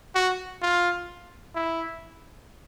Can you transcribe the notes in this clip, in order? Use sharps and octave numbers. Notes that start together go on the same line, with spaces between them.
F#4
F4
E4